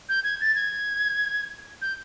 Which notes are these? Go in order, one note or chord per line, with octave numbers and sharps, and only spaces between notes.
G6
G#6
A6
G#6
G6